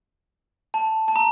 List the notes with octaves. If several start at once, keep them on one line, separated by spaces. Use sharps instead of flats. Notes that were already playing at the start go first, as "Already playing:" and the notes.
A5
A5
A#5